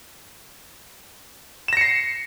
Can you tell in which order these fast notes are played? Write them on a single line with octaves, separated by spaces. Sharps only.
E7 A#6 C#7 C7